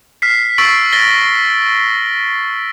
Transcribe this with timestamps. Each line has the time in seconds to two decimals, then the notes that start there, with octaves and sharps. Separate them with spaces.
0.22 F6 B6 C7
0.58 C#6 E6 A6 B6 D7 F#7
0.93 A6 A#6 G7